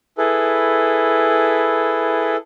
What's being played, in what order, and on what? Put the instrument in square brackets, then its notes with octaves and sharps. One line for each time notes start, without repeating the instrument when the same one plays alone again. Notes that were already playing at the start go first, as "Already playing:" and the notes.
[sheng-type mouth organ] E4 G#4 A4 B4